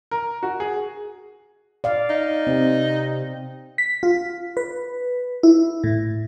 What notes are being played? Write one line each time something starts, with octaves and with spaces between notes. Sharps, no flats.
A#4
F#4
G#4
D5 F5
D#4
C3 C4
B6
F4
B4
E4
A2